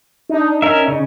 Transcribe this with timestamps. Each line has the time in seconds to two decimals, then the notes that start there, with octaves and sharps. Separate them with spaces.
0.29 D4 D#4
0.62 C#4 A#4 E5
0.88 C#3